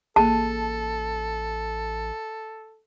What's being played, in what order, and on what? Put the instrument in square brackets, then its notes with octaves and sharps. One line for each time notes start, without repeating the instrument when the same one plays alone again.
[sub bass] A1 [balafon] A#3 G#4 [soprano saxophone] A4 [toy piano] A5